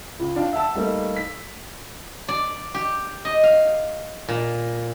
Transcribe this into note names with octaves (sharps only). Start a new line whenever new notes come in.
C#2
D4 F4 G5
E5 F#5 A5 E6
G3 A3 A#3 D#4
B6
D5
G4
D#5
F5
A#2